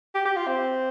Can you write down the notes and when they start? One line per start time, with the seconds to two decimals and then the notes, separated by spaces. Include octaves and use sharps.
0.14 G4
0.25 G4
0.36 F4
0.47 C4